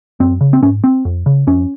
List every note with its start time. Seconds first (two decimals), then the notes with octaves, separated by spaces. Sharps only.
0.20 F#2 C4
0.41 C#3
0.53 C4
0.62 G#2 C#4
0.84 C4
1.05 F2
1.26 C#3
1.47 F2 C#4